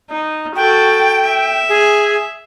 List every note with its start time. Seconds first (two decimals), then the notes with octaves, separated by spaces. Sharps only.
0.10 D#4
0.56 F#4 A4 G5
1.27 E5
1.69 G#4